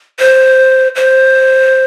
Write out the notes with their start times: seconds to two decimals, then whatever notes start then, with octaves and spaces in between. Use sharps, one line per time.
0.20 C5
0.96 C5